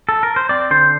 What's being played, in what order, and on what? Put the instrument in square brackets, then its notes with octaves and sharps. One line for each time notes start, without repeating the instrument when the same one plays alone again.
[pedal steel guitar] A4
A#4
C5
C4 D5
D3 C5